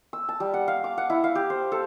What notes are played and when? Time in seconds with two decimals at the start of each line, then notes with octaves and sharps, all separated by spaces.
0.13 E6
0.29 A5
0.40 G3
0.54 F#5
0.68 F5
0.84 D6
0.98 F#5
1.10 E4
1.24 F5
1.35 G4
1.50 C5
1.72 A4